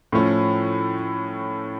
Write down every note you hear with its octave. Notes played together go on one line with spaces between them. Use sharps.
A2 F3 A3 C#4